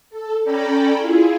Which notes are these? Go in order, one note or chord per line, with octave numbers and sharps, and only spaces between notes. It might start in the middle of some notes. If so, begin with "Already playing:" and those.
A4
C#4 A4 D5 G5 A#5 B5
E4 F4 G#4